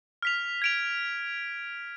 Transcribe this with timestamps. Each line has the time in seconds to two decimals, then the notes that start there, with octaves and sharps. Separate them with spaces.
0.22 F6 B6 F7
0.62 G#6 D7 F7